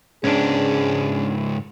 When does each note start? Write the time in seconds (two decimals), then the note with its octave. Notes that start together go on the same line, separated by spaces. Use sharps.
0.24 C#2 G#2 C#4 D4 G#4